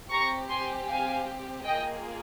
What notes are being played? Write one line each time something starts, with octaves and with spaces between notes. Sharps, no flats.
C4 G4 A#5 C#6
G#5 C6
F5 G#5
A#3 F4 G#4 D#5 G5